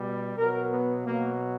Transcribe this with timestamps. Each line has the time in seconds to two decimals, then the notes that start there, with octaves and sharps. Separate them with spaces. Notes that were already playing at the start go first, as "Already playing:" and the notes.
Already playing: B2 G3
0.37 B2 F#3 A#4
0.72 B3
1.06 B2 F#3 A#3